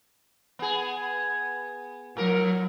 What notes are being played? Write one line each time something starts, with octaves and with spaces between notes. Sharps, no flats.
B3 G#4
A2 F#3 A#4